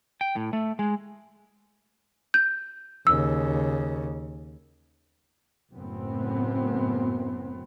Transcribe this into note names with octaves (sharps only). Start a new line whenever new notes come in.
G5
A2
A3
G#3
G6
D#2 C#3 E6
F#1 F#2 A2 B3 C4